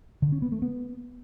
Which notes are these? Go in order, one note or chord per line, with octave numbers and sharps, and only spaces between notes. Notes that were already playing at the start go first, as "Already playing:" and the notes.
D3
C#4
B3
A3
B3